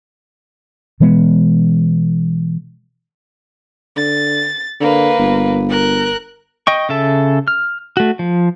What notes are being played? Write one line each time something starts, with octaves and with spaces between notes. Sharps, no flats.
B2 E3 G#3 B3
D3 A6
D3 A#3 B4
G1
A#4 F#6
D#5 G5 C#6
C#3 A4 E5 A5
F6
A3 F#4
F3